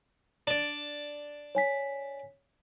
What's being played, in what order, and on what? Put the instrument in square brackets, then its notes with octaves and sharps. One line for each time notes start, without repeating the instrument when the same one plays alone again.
[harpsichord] D4 D5
[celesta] C#5 G#5 B6